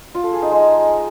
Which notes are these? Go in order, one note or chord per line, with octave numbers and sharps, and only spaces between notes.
F4
A4
G#4
D#4
G#3